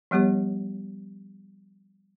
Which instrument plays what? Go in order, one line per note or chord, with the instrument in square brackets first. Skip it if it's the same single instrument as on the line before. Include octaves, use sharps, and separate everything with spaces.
[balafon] F3 G3 B3 G4 C#5